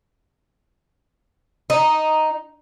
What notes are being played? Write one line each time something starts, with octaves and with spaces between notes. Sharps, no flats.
D#4